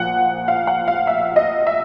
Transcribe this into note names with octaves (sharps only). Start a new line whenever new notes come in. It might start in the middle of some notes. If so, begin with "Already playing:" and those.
Already playing: A#2 F3 F#5
F5
F#5
F5
E5
D#5
E5